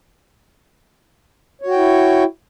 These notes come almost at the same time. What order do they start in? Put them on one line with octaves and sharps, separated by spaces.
C#5 F#4 G5 E4